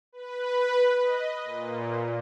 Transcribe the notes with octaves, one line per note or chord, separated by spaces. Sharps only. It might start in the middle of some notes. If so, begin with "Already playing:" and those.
B4
D#5
A#2